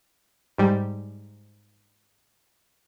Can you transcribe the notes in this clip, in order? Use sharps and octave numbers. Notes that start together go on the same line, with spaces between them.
G#2 G3